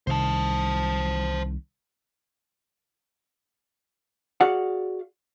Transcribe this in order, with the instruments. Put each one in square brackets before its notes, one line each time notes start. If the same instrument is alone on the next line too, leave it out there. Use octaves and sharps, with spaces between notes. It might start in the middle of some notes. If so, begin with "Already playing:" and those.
[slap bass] C2 D#3 [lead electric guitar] C5 A5
[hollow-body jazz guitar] F#4 G#4 D5 F5 F#5